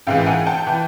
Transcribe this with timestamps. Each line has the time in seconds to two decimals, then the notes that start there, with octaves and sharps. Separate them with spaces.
0.07 A1 G#2 E3 F5 G5
0.27 F#5 G#5
0.47 G5 A5
0.67 E3